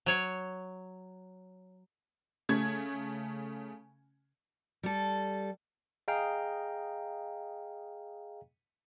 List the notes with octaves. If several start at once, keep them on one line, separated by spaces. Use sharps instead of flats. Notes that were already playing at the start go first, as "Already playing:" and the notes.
F#3 C#5
C#3 A3 G#6
G3 A4
G#4 D#5 F5 G5 A#5